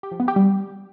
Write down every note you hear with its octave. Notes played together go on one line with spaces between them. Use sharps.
G4
F3
B3
G4
G3